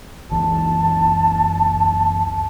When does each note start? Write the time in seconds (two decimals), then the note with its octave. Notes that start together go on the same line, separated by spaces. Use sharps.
0.31 F#1 C#2 E3 A5